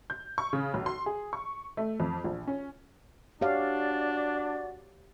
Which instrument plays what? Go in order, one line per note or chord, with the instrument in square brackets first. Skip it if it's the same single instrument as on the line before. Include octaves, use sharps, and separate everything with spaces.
[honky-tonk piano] G6
C#6
C#3
B1
C6
G#4
C#6
A3
F2
A#1
C#4
[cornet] D4 [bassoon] F#4 [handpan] G4 C#5 F5 [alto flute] D5